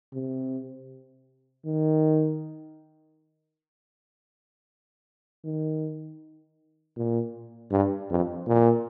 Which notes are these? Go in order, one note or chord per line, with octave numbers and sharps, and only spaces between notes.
C3
D#3
D#3
A#2
G2
F2
A#2